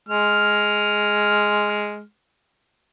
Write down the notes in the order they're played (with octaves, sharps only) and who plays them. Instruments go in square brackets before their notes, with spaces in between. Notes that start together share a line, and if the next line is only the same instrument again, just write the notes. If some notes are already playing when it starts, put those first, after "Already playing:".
[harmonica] G#3 F6